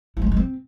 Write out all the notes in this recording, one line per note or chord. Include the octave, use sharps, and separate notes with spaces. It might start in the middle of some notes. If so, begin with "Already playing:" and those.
E4
G#3
C#4
G#3
C4